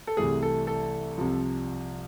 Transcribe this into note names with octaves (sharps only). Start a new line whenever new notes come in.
A4
C2 C3 E3 A3 G#4
A4
A4
C2 C3 F3